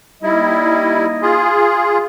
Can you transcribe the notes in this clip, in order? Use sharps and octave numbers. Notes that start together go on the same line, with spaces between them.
G3 A#3 D#4 E4 D#5
F4 G#4